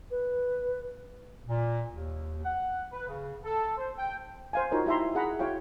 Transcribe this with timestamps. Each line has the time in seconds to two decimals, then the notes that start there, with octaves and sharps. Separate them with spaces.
0.11 B4
1.46 A#2
1.92 D#2
2.43 F#5
2.92 B4
3.08 C#3
3.45 A4
3.77 C5
3.97 G5
4.53 C5 F5 G#5
4.72 D#4 F4 F#4 A#4 C5 C#5
4.86 E4 G4 E5 A#5 C6
5.15 G#4 F#5 A#5 B5
5.39 E4 F#4 C#5 F5 G5